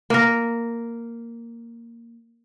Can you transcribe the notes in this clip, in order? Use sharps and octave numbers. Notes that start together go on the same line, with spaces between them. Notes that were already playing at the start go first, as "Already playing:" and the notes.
A#3 A#4